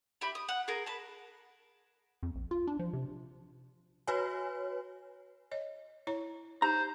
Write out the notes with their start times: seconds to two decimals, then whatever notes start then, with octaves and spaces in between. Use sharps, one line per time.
0.21 G4 E5 B5
0.35 D#6
0.49 F#5
0.68 G#4 A#4
0.86 B4 A5
2.23 F2
2.35 A#1
2.51 F4
2.67 D4
2.79 F3
2.93 C3
4.07 F#4 B4 C#5 G#5
5.51 C#5 D#5
6.07 E4 C#5 A#5
6.62 D#4 G4 C5 A#5